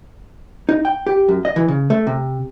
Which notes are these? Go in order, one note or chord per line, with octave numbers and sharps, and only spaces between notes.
D#4
G5
G4
F#2
D#5
E3
C#3
A3
C3